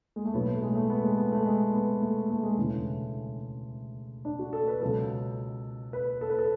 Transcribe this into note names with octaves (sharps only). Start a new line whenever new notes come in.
G#3
A3
B1 A2 F#3 B3
A3
G#3
A3
B3
G#3
B3
A3
G#3
B3
A3
A3
G#3
E1 D2 C#3 E3 A3
D4
F#4
A4
B4
C#2 B2 F#3 A4
B4
A4
B4
A4